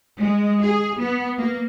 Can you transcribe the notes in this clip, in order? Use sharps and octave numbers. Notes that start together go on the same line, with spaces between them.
G#3
G#4
B3
A#3